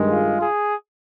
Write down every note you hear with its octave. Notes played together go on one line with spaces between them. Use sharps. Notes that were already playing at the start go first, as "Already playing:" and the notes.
Already playing: G2 D#3 G#3
F4
G#4